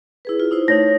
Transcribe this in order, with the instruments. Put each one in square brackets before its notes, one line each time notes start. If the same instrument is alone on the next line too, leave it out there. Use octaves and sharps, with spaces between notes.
[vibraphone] E4 G#4 B4
F4
D#4 E4 C5
[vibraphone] A3 D#4 [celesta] C#5 A#6